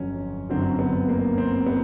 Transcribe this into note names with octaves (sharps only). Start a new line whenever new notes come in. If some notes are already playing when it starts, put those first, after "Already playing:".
Already playing: G1 F2 F#3 C#4
G1 F#2 D3 F#3 C4
B3
A#3
C4
B3